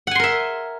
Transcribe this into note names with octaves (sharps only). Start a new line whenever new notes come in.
A#4 E5 F#5 G#5 C6